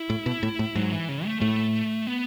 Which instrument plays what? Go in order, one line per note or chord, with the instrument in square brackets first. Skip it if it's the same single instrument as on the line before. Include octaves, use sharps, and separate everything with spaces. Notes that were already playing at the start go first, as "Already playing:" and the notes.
Already playing: [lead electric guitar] E4
[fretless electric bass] A2
B2
A2
A2
[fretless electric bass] G#2 [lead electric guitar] F#3
[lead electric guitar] E3
C#3
A3
[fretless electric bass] A2 [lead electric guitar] A3
[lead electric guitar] B3